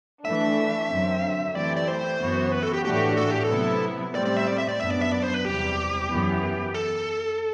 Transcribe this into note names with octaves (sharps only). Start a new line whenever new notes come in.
E3 A3 D4 E5
F#2 D3 F#3 C4
E3 A3 C4 E4 G4 D5
D5
C5
F#2 E3 B3 F#4
B4
A4
G4
A2 E3 A3 D4 F#4 G4
A4
G4
A4
C3 F#3 B3 E4
A2 G3 C4 D5
D5
E5
D5
E5
D5
F#2 F#3 B3 D4 E5
D5
E5
D5
C5
B4
E2 C3 G3 G4
F#2 E3 B3
A4